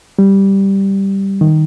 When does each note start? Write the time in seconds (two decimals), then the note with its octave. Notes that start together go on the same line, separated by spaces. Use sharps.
0.19 G3
1.41 D#3